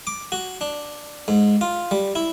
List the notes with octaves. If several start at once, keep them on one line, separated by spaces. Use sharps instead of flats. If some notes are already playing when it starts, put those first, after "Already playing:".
D6
F#4
D4
G#2
F4
G3
E4